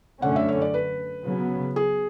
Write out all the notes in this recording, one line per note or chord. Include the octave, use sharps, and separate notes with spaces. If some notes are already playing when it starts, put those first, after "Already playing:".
F#2 D3 A3 C#4 F#5
E5
C#5
D5
B4
C#3 F#3 B3
G#4